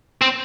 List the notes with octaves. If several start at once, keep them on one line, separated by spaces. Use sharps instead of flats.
C4